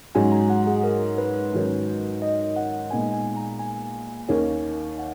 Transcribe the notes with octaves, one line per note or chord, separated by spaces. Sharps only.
G#2 F#3 C#4 G#5
A#5
F#5
G#4
A#4
B4
G#2 D#3 F#3 C#4
D#5
F#5
A#2 G#3 B3 D#4 G#5
G#5
A#5
G#5
D#2 D#3 A#3 C#4
F#5